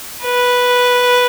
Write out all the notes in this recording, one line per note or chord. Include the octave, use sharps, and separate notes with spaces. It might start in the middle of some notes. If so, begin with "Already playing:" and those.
B4